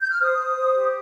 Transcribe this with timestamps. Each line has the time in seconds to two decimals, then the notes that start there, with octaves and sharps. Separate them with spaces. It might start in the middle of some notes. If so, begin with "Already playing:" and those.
0.01 G6
0.10 F6
0.20 C5 D#6
0.38 C5
0.56 C5
0.74 G4